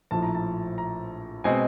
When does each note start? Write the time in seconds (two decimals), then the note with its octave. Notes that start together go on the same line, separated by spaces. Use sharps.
0.11 A#1 A2 F3 A5
0.23 A#5
0.35 A5
0.78 A#5
1.44 B2 G#3 C4 G#5